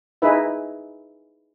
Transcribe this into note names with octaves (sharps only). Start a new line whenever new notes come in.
D#4 E4 G#4 B4 E5